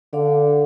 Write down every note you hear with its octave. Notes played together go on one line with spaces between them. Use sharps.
D3 D4 A4 D5 F5